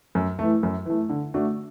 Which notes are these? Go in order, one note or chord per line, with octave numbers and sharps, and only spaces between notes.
F#2
E3 A3
F#2
E3 A3
D3
A3 D4 F#4